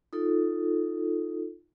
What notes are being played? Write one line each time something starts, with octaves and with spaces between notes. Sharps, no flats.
D#4 F4 A4